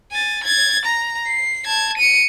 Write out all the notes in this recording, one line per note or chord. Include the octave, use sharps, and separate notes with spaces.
G#5 A6
G#6 A6
A#5
C7
A5 G#6
C#7 D#7